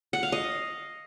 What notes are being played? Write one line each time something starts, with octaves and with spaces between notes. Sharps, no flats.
F#5
F5
D#5